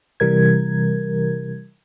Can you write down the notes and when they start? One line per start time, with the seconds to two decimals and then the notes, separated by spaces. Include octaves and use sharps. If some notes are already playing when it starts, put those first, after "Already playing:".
0.20 C3 E3 G3 A#4 G#6